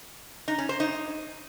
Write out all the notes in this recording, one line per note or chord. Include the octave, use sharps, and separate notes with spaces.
D#4
C#4
C5
D#4